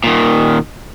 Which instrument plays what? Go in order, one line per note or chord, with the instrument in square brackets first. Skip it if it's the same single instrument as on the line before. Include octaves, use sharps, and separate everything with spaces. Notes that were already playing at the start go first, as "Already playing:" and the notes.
[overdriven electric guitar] A#2 D#3